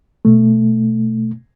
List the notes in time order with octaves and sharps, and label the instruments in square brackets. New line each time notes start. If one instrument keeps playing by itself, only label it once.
[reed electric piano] B2 A3